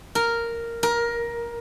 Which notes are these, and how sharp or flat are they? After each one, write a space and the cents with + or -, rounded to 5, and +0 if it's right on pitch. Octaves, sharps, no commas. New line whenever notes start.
A#4 -5
A#4 +15